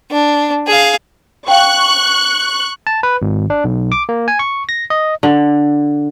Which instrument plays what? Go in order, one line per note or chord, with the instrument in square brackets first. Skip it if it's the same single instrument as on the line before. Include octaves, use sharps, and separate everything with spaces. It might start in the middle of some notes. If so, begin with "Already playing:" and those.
[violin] D4
G#4 F5
[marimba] F5 G5 [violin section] C#6 F#6
[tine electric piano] A5
B4
G#1
D4
B1
D6
A#3
G#5
C#6
A#6
D#5
[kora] D3